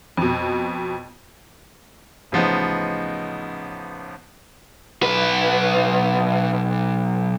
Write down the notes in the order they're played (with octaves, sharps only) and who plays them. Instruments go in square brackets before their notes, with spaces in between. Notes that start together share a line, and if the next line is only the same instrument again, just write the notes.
[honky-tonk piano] F2 B2
[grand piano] A1 C#3 F3 B3 D#4 D#5
[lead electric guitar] B1 B4